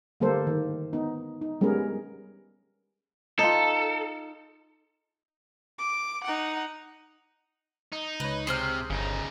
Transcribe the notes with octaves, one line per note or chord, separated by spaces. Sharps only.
D3 G3 A3 A#3 A4 C5
D#3
B3 D#4
D#4
G3 G#3 B3 C#4 G#4 A#4
D#4 F4 A4
D6
D#4 F#5
D#4
C#2 B4 C#5
C3 G#4 C5 F6
G1 C#3 D#4